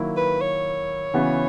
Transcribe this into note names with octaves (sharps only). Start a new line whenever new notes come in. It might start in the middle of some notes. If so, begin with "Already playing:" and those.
Already playing: D#3 F#3 A#3 E4
B4
C#5
C#3 E3 B3 F#4